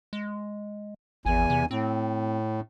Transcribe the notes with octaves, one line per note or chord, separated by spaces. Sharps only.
G#3
G#1 E2 G#5
C3
A2 C4